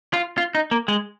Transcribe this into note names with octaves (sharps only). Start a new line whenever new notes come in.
F4
F4
D#4
A#3
G#3